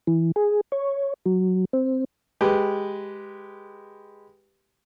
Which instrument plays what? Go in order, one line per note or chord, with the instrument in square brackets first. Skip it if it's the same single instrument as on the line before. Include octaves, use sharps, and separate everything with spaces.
[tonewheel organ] E3
G#4
C#5
F#3
C4
[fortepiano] G#3 G4 B4